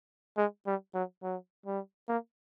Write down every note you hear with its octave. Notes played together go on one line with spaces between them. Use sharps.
G#3
G3
F#3
F#3
G3
A#3